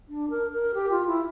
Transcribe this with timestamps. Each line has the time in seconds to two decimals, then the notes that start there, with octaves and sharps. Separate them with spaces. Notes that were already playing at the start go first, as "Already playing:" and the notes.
0.09 D4
0.30 A#4
0.52 A#4
0.74 G4
0.91 F4
1.07 E4